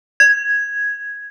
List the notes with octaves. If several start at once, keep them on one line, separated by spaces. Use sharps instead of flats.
G#6